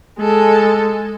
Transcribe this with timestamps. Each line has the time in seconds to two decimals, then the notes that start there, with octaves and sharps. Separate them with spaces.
0.20 G#3 A4